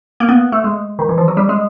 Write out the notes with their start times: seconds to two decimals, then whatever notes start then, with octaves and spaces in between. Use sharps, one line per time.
0.20 A#3
0.29 B3
0.52 A3
0.64 G#3
0.99 D#3
1.09 E3
1.18 F3
1.28 F#3
1.37 G3
1.49 G#3